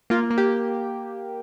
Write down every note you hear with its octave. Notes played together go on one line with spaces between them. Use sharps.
A#3 F4
A#3
G4